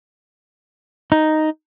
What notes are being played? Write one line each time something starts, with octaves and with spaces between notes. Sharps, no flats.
D#4